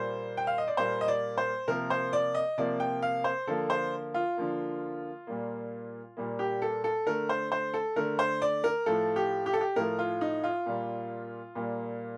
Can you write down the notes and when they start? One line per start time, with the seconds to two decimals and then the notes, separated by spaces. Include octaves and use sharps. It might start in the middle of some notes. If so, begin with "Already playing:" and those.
Already playing: A#2 G3 A#3 C5
0.37 G5
0.47 F5
0.58 D#5
0.68 D5
0.77 A#2 G3 A#3 C5
1.01 D#5
1.08 D5
1.38 C5
1.68 C3 F3 A#3 A#4
1.90 C5
2.13 D5
2.35 D#5
2.58 C3 F3 A#3 D5
2.80 G5
3.02 F5
3.24 C5
3.47 D3 F3 A#3 A4
3.70 C5
4.14 F4
4.37 D3 F3 A#3
5.27 A#2 G3 A#3
6.17 A#2 G3 A#3
6.39 G4
6.62 A4
6.84 A4
7.07 D3 A3 A#4
7.29 C5
7.52 C5
7.74 A4
7.96 D3 A3 A#4
8.19 C5
8.42 D5
8.64 A#4
8.86 A2 F3 A3 A4
9.16 G4
9.46 G4
9.53 A4
9.61 G4
9.76 A2 F3 A3 A#4
9.99 F4
10.21 D#4
10.44 F4
10.66 A#2 G3 A#3
11.55 A#2 G3 A#3